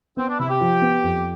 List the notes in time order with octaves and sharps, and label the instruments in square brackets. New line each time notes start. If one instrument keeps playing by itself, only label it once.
[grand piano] B3 [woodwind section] C4
[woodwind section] D4
[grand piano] C3 [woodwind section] E4
[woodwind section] G4
[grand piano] F3
B3
F2